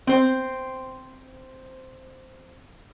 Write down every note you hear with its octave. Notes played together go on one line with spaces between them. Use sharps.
C4 C5